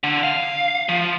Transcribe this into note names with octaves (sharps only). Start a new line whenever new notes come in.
D3
F5
F3